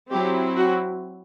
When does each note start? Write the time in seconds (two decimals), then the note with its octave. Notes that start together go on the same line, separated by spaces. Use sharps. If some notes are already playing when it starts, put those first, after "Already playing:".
0.12 F#3 C4 E4 G4
0.57 F#4